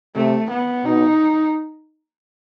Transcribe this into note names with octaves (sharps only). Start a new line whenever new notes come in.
C3 A3
B3
B2 D#4